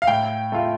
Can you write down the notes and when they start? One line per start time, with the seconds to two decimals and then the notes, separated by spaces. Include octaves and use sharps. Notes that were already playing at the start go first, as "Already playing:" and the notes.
0.02 F5
0.07 A2 G5
0.52 A3 F4